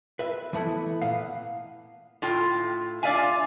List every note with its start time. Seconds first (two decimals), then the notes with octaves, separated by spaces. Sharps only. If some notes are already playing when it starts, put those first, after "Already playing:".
0.19 B4 E5
0.53 E3 A3 B3 E4
1.02 A#2 B3 F5
2.22 A2 F4 G5
3.03 D4 F4 D5 E5 F5 G#5